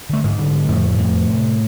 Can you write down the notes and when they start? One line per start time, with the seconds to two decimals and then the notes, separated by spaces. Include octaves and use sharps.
0.09 D3 A3
0.24 G#2 G#3
0.39 D3
0.68 F2 A2 A3
0.98 F2
1.28 C3